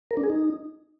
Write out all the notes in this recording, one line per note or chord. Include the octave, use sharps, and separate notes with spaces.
A#4
D4
G#4
D#4